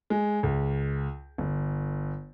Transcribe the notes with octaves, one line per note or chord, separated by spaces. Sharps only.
G#3
C#2
G1